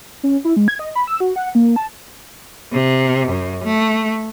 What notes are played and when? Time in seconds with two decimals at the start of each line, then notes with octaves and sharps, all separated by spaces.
0.23 C#4
0.45 E4
0.56 G#3
0.68 G#6
0.79 D#5
0.95 B5
1.07 E6
1.20 F#4
1.36 F#5
1.55 A#3
1.76 A5
2.72 C3
3.28 F#2
3.64 A3